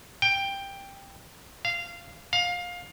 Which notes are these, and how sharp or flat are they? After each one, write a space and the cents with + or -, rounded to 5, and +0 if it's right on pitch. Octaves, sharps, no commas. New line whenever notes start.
G5 +10
F5 -15
F5 +20